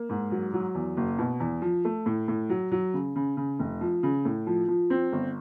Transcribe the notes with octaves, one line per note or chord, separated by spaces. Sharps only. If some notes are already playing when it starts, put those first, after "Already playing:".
Already playing: A#3
G#2
F#3
F#3
E2
F#1
B2
E2
F3
A3
A2
A2
F#3
F#3
C#3
C#3
C#3
F1
F3
C#3
A2
F3
F3
C4
G1